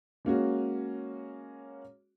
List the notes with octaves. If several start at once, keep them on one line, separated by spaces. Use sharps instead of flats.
G#3 A#3 C#4 F#4